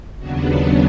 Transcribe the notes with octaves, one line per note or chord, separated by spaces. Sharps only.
D#2 C#3 F#3 B3 D4 F#4
F4